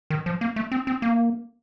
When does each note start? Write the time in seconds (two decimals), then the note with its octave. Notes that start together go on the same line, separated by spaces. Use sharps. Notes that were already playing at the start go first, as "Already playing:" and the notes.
0.10 D#3
0.26 F3
0.41 A#3
0.56 A3
0.72 C4
0.87 C4
1.02 A#3